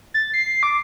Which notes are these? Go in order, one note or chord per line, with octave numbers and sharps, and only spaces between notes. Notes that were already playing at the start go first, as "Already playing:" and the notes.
A6
C7
D6